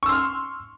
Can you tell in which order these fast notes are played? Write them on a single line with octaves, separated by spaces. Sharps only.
C#6 E6 C6 F6